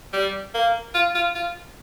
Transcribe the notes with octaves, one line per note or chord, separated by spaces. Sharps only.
G3
A#3
F4
F4
F4